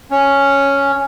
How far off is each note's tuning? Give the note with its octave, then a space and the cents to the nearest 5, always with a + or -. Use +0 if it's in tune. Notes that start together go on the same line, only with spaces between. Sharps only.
C#4 +0